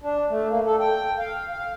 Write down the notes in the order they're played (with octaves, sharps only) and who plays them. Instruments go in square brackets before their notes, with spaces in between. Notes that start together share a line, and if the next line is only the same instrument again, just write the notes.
[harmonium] D4
A3
A#3
A4
G5
F5
F5